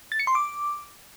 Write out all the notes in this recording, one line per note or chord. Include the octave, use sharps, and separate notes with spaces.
A6
C#7
C6
D6